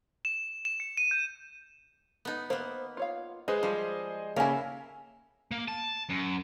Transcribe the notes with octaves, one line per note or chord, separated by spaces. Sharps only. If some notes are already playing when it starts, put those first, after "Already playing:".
E7
E7
C#7
D#7
G6
B3 D#4
A#3 B3 C5
F4 C#5 F5
G#3 G#4 B4 C5 D#5
F3 G3 F4
C#3 A#3 C#4 E4 A#4 F5 G#5
A#3
A5
F#2